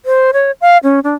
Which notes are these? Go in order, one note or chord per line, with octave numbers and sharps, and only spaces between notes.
C5
C#5
F5
C#4
D4